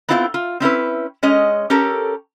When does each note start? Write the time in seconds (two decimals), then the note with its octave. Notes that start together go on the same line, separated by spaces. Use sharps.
0.09 B3 C4 E4 F4 E5 G5
0.34 F4
0.60 C4 C#4 E4 B4
1.23 G#3 C#4 D#5
1.70 C#4 G4 A4 A#4